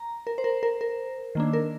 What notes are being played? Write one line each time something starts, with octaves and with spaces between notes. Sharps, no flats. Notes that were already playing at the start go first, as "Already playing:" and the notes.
Already playing: A#5
A#4
C5
A#4
A#4
A#4
D#3 A#3 D4
A#4